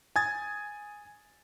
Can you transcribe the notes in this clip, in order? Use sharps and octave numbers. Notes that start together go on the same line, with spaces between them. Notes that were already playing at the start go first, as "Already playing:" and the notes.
G#5 D#6 G#6 A6